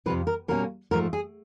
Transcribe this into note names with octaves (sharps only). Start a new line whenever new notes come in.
F2 C3 F3 B4
A#4
B2 G3 A#3 C#4 A#4
G#2 F3 A3 A#4
G#4